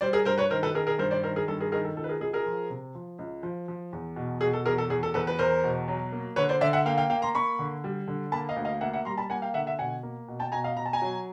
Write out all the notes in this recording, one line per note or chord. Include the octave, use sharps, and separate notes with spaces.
G3 C5 D5
G#4 A#4
G2 A#4 C5
B4 C#5
D#3 A#4 C5
A4 B4
D#3 G#4 A#4
G#4 A#4
G2 A#4 C5
C5 D5
D#3 A#4 C5
G#4 A#4
G2 A4
G#4 A#4
D#3 G#4 A#4
A4
C#2 A4
B4
G#4 A#4
C#2 G#4
G#4 A#4
F3
C3
F3
C#2
F3
F3
E2
B2
B2 G#4
A4
E2 G#4 A#4
A4
E2 G#4
A4
E2 A4 B4
B4
E2 A#4 C5
B2
F#3
A#3
D3 B4 C#5
C5 D5
D3 D5 E5
E5 F#5
A#3 F5 G5
F5 G5
A#3 F5 G5
A#5 C6
A#3 B5 C#6
D3
G3
D3
A#3 A5 B5
D#5 F5
D2
D#5 F5
A#3 E5 F#5
E5 F#5
G3 A#5 C6
A5 B5
A#3 F#5 G#5
F5 G5
D3 E5 F#5
E5 F#5
B2 F#5 G#5
A#3
B2
G5 A5
B2 G#5 A#5
D#5 F5
B2 A#5
A5
G#5 A#5
F#3